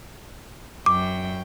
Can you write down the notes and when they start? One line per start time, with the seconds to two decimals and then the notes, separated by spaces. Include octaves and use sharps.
0.86 F#2 G5 D6